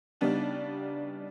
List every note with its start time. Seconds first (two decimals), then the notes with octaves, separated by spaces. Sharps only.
0.21 C#3 G3 B3 D4 D#4